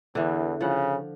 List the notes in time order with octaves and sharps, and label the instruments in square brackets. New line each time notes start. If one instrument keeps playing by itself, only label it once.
[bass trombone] E2 [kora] D3 E3
[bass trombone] C#3 [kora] F3 F#5